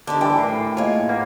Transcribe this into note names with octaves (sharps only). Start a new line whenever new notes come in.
D3 D4 D#4 G4
E3 G3 D4 G5
A2 A#4
G#3 A#3 F4 C#5
A#3 B3